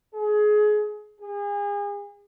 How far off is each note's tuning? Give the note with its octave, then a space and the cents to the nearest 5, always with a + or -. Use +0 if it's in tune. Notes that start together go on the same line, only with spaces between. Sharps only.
G#4 +25
G#4 -35